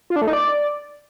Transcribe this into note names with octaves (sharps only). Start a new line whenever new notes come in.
F4
D4
A3
D#4
D5